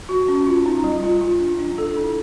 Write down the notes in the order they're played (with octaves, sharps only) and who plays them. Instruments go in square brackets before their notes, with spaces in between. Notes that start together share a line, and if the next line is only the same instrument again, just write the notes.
[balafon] F#4
C#4
F4
D#4
G3
F4
F4
D4
D4
A4
E4